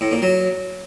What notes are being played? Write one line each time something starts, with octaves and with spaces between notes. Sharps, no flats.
A2
A#2
F#3